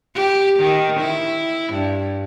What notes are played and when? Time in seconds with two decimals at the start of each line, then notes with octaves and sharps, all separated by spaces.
0.15 G4
0.59 D#3
1.00 E4
1.73 G2